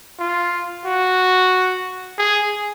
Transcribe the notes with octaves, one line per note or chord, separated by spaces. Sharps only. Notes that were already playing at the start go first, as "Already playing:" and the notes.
F4
F#4
G#4